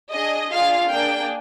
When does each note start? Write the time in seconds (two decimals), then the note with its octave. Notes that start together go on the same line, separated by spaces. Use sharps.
0.11 D4 G#4 D#5
0.51 D4 F4 G#4 F5
0.90 A#3 D4 G#4 G5